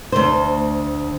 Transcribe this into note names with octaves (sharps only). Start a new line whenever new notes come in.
D2 C5